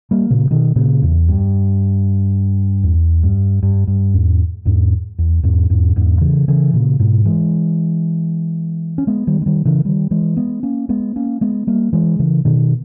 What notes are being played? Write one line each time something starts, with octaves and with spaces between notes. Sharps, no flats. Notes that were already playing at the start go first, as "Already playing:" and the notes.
G3 A#3
A#2 C#3
B2 D#3
A#2 C#3
E2
G2
E2
G2
G2
G2
E2 G#2
E2 G#2
E2
E2 G#2
E2 G#2
E2 G#2
C#3 E3
C#3 E3
A#2 C#3
G#2 B2
E3 G#3
C#4
G#3 B3
D#3 G3
G#3
D#3 G3
C#3 E3
D#3 G3
E3 G#3
G#3 B3
A#3 C#4
G#3 B3
A#3 C#4
G#3 B3
G3 A#3
E3 G#3
C#3 E3
B2 D#3